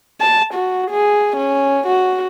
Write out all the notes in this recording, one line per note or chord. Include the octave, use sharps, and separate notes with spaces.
A5
F#4
G#4
C#4
F#4